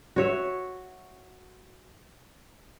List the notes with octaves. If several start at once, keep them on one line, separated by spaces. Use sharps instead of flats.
F#4 C#5 E5